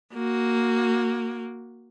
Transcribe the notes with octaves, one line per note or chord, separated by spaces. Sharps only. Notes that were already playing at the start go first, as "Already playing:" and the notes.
A#3 F#4